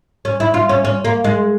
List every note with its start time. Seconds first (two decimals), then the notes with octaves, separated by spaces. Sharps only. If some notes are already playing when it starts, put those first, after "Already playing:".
0.25 C#4
0.40 E4
0.54 F4
0.69 C#4
0.85 C#4
1.04 A#3
1.24 G#3